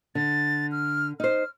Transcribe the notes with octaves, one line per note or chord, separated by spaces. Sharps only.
D3 A6
F6
D#4 C5 F6